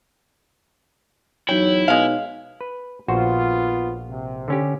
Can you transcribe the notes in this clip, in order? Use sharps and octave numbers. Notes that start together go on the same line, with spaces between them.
E2 F#3 D#4 E4 C#5 G5
B2 G#3 F5
B4
A#1 B3 F4 F#4 C5
C3
D3 C#4 G4